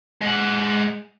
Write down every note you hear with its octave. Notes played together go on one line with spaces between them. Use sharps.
G#3 F#5